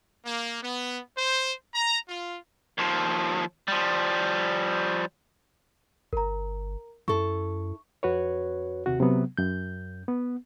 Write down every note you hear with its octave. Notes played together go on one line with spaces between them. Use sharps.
A#3
B3
C5
A#5
F4
D#2 F3
F3 G3
G1 A#4 A#5
F#2 E4 A4 C#6
F2 F#4 B4 C#5
D#2 C3 F#4
C3 F#3 B3
F#2 G6
B3